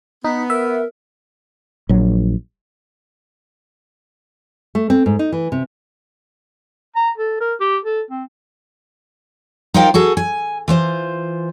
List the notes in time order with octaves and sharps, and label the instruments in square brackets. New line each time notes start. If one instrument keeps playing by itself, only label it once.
[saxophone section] B3 [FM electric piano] D#4 [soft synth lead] B6
[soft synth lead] A#4 [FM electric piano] E5
[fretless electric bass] A#1 F#3
[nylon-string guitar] A3
C4
G#2
D#4
E3
C3
[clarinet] A#5
A4
A#4
G4
A4
C4
[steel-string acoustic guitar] D#4 F4 A#4 C5 F5 G5
F#4 G#4 A4
G#5
E3 F4 C5